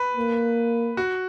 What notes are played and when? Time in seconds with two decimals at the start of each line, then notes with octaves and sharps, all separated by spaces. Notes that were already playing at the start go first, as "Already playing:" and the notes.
Already playing: B4
0.17 A#3
0.97 F#4